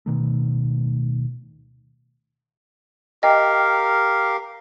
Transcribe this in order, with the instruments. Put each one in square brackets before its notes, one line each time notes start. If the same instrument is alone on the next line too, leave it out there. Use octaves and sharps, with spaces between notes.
[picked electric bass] D1 B2 D#3 A3
[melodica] G4 A#4 F5 [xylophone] D#5 G5